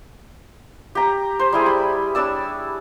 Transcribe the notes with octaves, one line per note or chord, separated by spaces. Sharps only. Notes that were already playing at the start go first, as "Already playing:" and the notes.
G4 A#5
C5
G3 E4 G#4
B5
D4 C#5 D5 E6